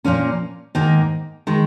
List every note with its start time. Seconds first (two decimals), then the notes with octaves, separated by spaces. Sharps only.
0.04 A#2 F3 A#3 C#4
0.75 G#2 D#3 A#3 D#4
1.47 D#3 G#3